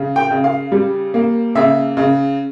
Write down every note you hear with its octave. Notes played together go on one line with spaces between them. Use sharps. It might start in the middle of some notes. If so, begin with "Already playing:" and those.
Already playing: C#3
G5
C#3
F5
G3
A#3
C#3 E5
C#3